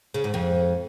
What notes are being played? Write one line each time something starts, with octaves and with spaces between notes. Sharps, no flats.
C#3
G#2
F2